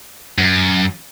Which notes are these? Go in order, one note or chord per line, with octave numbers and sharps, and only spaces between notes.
F#2